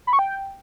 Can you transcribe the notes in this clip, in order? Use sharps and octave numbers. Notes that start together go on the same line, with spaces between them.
B5
C#6
G5